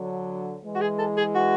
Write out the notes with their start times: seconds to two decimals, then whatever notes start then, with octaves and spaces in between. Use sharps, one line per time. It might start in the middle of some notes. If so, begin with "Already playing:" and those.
Already playing: D3 F#3
0.63 E3 G#3
0.75 F#4
0.81 G#4
0.99 A4
1.17 G#4
1.35 F#4